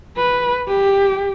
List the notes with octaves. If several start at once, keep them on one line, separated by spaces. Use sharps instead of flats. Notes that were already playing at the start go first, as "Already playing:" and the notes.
B4
G4